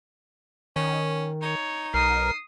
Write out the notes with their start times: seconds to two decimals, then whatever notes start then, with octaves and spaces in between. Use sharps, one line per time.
0.76 D#3 C#4
1.42 D#4 C#5
1.94 B1 A#4 D#6 C7